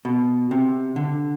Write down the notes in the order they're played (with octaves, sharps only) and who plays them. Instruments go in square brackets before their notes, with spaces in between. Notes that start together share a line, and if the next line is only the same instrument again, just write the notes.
[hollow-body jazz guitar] B2
C3
D3